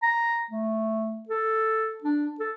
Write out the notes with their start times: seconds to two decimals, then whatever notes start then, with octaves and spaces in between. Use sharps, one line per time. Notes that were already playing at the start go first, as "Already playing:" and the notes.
0.03 A#5
0.51 A3
1.29 A4
2.04 D4
2.39 A4